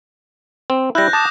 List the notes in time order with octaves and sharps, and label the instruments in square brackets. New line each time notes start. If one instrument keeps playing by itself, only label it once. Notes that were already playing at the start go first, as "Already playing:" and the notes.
[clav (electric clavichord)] C4
[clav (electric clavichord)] G3 E4 [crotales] F#6 G6 A#6
[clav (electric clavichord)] A5 [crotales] D6 D#6 E7